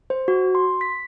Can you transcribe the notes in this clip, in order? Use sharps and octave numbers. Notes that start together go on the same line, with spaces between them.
C5
F#4
C6
B6